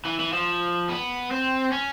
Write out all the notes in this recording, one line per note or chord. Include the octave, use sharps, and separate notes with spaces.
E3
E3
F3
B3
C4
C#4